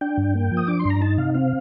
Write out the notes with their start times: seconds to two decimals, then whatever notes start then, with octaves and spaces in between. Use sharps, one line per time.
0.01 D4 G5
0.17 G2
0.35 A#3
0.51 F3
0.57 D#6
0.68 D4 D6
0.79 C6
0.85 G2 A#5
1.02 D#4 A5
1.18 C3 F5
1.34 C4 F5